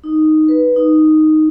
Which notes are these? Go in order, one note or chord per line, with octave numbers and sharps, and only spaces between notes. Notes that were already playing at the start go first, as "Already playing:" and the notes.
D#4
B4
D#4